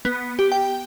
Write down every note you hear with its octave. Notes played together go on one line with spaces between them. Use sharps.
B3
G4
G5